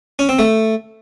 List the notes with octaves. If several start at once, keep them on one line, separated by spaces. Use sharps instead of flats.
C#4
C4
A3